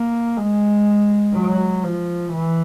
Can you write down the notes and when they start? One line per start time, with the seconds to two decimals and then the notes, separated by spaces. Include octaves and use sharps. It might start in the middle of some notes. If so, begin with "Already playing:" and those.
Already playing: A#3
0.37 G#3
1.34 F#3
1.84 F3
2.33 E3